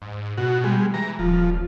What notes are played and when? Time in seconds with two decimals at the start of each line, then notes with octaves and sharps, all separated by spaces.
0.02 G#2
0.37 B2 F#4
0.64 G3 G#3
0.94 E3 A#5
1.19 D#1 F3